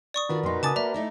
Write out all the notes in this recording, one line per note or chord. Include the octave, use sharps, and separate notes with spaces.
D5 C#6 D#6
D#3 D4 F4 F#4 A#4 B4
F2 A#2 D#4 C6
C#3 G#5 A5 D6 D#6 A6
A#3 D5 E5 A#5
A3 D#4 E4